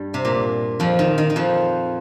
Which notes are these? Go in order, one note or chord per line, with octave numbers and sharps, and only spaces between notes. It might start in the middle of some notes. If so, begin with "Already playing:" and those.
Already playing: G2 G3
C3
A#2
F2 F3
D#3
D#3
D#3
F2 F3